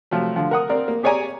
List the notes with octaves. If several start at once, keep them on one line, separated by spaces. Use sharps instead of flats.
C3 F3 F#3 A3
D3 F3
A#4 F#5 D#6
C4 A#4 D5
A#3
G4 G#4 C#5 D5 G#5 A#5